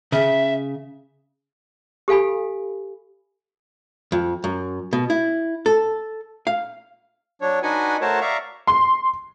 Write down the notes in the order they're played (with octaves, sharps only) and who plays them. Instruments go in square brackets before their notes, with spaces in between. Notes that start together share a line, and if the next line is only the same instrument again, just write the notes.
[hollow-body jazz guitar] C#3 [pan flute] E5
[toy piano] G4 A4 F5 G#5 B5
[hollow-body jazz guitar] F2
F#2
B2
E4
A4
F5
[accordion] F#3 D4 C#5
D4 D#4 F#4 B4 F#5 G#5
A3 F#4 A#4 C5 C#5 A5
D5 E5 F5 A#5 C#6
[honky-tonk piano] C6